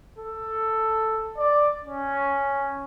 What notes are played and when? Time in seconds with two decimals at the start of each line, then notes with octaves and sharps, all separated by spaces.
0.19 A4
1.38 D5
1.83 C#4